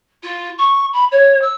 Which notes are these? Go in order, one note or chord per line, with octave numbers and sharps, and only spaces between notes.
F4
C#6
B5
C#5
E6